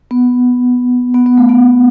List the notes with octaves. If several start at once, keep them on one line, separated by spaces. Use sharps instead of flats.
B3
B3
B3
A3
B3